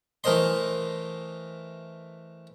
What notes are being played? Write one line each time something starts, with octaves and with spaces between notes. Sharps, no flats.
E3 A3 A#4 C5 D#5 C6